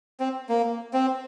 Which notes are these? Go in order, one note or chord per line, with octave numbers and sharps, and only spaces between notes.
C4
A#3
C4